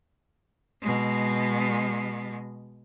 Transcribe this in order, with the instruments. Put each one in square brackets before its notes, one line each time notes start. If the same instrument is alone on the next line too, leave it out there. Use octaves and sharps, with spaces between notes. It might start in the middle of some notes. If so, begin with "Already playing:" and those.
[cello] B2 G#3